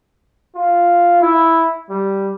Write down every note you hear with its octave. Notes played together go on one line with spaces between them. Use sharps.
F4
E4
G3